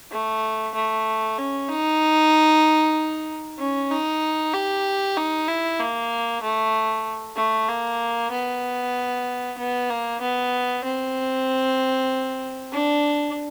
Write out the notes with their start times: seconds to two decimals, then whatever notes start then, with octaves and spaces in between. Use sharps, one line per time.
0.11 A3
0.75 A3
1.38 C#4
1.69 D#4
3.59 C#4
3.91 D#4
4.54 G4
5.17 D#4
5.48 E4
5.80 A#3
6.42 A3
7.36 A3
7.68 A#3
8.32 B3
9.58 B3
9.90 A#3
10.21 B3
10.84 C4
12.73 D4